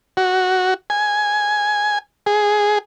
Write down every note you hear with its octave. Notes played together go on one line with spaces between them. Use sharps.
F#4
G#5
G#4